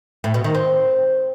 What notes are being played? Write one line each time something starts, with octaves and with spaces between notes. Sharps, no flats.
A2
B2
D#3
C4